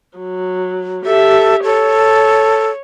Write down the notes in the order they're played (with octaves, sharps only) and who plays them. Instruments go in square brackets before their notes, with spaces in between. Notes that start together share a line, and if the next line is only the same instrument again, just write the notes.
[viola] F#3
[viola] G4 E5 [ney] A4
[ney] A4 [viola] C#5